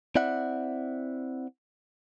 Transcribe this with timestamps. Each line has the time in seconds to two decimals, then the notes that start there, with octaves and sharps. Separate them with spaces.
0.15 C4 E4 D5 E5 F#5